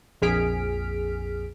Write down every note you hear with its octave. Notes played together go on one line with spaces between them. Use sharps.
A#1 F2 G#4 F6 B6 D7